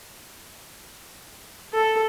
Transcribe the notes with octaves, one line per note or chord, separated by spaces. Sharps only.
A4